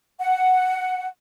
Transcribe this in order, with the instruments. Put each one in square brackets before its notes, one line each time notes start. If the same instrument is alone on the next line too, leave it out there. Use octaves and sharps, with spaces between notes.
[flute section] F#5